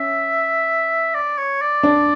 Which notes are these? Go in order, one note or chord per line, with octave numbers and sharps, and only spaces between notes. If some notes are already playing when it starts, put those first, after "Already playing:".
Already playing: C#4 E5
D5
C#5
D5
D4